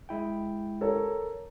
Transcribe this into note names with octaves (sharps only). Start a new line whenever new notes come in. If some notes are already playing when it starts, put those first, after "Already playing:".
G#3 E4 G5
A4 A#4 C#5